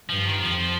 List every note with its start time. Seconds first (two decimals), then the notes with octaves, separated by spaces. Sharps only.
0.09 G2 F3
0.26 D#3
0.42 F2 F3